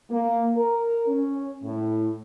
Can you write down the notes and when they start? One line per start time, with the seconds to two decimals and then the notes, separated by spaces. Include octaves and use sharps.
0.10 A#3
0.56 A#4
1.08 C#4
1.64 A2